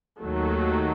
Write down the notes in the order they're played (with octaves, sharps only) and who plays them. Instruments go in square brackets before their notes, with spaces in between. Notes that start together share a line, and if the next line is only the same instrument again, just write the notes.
[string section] D#2 D#3 F#3 A3